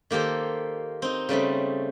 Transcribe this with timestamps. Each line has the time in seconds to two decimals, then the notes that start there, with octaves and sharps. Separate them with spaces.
0.11 D#3 A#3 G4 A4 C5
1.02 C4 D#4
1.29 C#3 G3 A3 C4